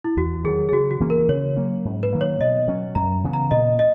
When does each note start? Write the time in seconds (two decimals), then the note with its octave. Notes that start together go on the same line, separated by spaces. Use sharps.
0.04 E4
0.17 E2 F#4
0.44 D#3 F#3 G#4
0.69 G#4
0.72 C#3 F#4
0.91 F#4
1.00 E3 A#3 C#4
1.10 A#4
1.28 C#3 C#5
1.56 F#3 A#3 C#4
1.85 G#2
2.03 B4
2.13 D#3 F#3 A#3
2.21 C#5
2.40 B2 D#5
2.68 F#3 C#4
2.95 F#2 A#5
3.24 C#3 E3 B3
3.33 A#5
3.51 A#2 D#5
3.79 D#5